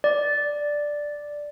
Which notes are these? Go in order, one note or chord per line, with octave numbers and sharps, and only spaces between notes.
D5